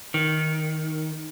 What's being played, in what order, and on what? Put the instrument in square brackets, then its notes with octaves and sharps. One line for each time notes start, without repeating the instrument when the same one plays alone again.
[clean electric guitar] D#3